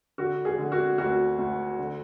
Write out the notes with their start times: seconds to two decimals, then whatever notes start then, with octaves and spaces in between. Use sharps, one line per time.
0.18 D3 F#4
0.45 G#4
0.58 D3
0.72 F#4
0.98 D2 F#4
1.39 D2
1.79 D3